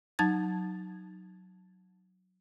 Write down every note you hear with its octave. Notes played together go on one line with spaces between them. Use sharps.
F#3 D#4 A5 G#6 A6